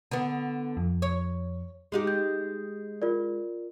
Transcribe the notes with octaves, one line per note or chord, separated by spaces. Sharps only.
D3 B3
F2
C#5
G#3 D#4 G4
G6
F4 A#4 D5